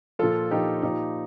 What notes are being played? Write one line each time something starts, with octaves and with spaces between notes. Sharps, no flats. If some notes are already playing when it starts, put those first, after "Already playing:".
A#2 F3 F4 A4
A#2 F3 D#4 G4
A#2 F3 D#4 G4